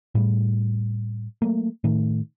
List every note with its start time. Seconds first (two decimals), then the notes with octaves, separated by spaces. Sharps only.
0.15 A2 G3
1.42 F#3 A3 A#3
1.84 A2 D#3 A3